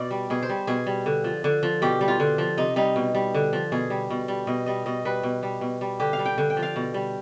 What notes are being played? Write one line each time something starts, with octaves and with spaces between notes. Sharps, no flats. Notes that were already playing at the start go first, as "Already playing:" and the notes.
Already playing: B2 D5
G3
B2 G#4
C5
G3
B2 G#4
G3
D3
F3
D3
F3
B2 G4
G3
F4
D3
F3
C3 D#4
G3 D#4
B2
G3
D3
F3
B2 G#4
G3
B2
G3
B2 D#5
G3 D#5
B2 D#5
G3 B4
B2
G3
B2
G3
D3 G4
F5
G3
G5
D3
G5
F3
F5
B2
G3